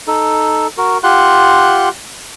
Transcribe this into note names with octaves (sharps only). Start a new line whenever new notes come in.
D#4 A4
F#4 A#4
F4 G4 F#5 C6 F#6